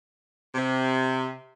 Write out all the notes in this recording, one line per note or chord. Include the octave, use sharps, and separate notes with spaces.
C3